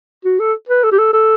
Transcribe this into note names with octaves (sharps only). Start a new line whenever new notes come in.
F#4
A4
B4
A4
G4
A4
A4